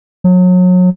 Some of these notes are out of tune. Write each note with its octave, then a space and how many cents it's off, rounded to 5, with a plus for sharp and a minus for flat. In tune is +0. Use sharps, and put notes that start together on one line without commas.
F#3 -30